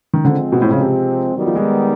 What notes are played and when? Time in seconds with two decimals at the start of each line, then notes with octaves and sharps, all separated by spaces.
0.14 D#3
0.25 D3 F3 G#3 C4
0.52 B2
0.62 A2
0.71 C#3
0.81 C3
1.36 D#3 F#3 G3 B3 D#4
1.46 F3
1.55 G#3